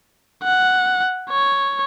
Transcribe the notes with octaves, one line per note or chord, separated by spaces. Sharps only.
F#5
C#5